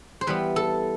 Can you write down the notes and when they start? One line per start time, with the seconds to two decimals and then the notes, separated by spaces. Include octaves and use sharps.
0.21 C5
0.27 E3 G3 B3 B4
0.56 A4